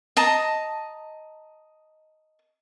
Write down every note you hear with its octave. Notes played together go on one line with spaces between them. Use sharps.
D#5 A5 A#5